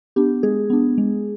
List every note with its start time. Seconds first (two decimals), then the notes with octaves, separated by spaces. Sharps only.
0.16 B3 D4 G4
0.43 G#3 G#4
0.70 B3 D4
0.98 G#3